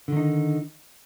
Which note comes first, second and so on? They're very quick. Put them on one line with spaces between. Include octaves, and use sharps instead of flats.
D3 D#3 D#4